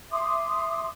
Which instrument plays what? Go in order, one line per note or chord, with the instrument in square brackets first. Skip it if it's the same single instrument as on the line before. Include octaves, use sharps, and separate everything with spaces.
[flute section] E5 C6 D6 D#6